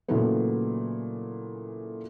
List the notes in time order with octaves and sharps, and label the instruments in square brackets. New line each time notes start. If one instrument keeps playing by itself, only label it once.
[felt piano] A#2 C#3 E3 F#3 A3 B3